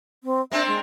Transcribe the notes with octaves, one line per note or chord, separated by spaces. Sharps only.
C4
A#3 C4 D4 E5
G#3